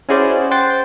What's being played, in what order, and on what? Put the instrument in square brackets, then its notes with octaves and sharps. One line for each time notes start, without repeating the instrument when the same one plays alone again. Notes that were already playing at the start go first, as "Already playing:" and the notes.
[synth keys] C#4 E4 F#4 G#4 C5 D5
C5 F#5 G5 C6 A6